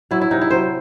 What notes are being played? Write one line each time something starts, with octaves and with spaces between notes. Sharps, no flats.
F#3 E4
E4
C3 D#4
E4
F#3 C5